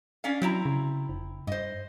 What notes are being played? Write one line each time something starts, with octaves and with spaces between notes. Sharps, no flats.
C#4 D4 F5
F#3 C4 E4 A#5
C#3
F1
G2 C5 D#5